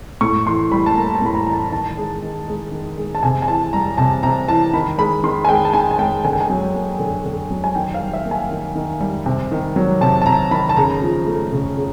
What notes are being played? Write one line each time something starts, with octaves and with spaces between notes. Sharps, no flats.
A2 C#6
E3 C6
G3 B5
A5
A#3 A#5
A5
A2 B5
A#5
E3 A#5
A5
D#3 A5
G#3
D#3
G#3
D#3
G#3
A5
C3 G#5
G#5
E3 A5
G3 A#5
C3 A5
C3 A#5
E3 A5
D#3 B5
G#3 B5
D#3 C6
G#5
G#3 G5
A5
D#3 G#5
G#5
G#3 G5
D3 G#5
G5
G#5
F#3
A#3
D3
D3
F#3
G#5
D#3 G5
F5
G3
E5
A#3
G#5
D#3
D#3
G3
C3
D#3
F#3
C3 A5
A5
C3 A#5
D#3 B5
A5
C#3 A#5
F3
A3
C#3
C#3